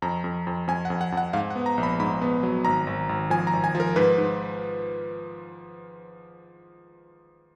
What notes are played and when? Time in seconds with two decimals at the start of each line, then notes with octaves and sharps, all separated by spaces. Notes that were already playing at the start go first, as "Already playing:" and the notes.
0.02 F2 A#5
0.24 F2
0.47 F2
0.68 F2 G#5
0.85 F#5
0.90 F2
1.01 F#5
1.12 F2
1.17 F#5
1.33 G#2 F5
1.50 F#5
1.55 B3
1.66 A#5
1.78 A#1
1.83 B5
1.99 G#2 B5
2.21 B3
2.43 F#3
2.65 G#1 A#5
2.87 G#1
3.09 G#1
3.30 F3 G#5
3.47 A#5
3.53 G#1
3.64 G#5
3.75 F3
3.80 A#4
3.96 G#2 B4
4.18 G#2